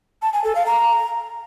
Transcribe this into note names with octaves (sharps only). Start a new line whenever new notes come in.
A5
G#5
A4
F5
A#5